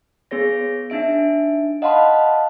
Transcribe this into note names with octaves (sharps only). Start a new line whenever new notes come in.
B3 G#4 C#5 A#6
D4 D#4 E5 D7
D#5 F5 F#5 A5 B5 C6